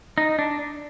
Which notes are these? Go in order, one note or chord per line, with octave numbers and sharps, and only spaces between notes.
D#4
D4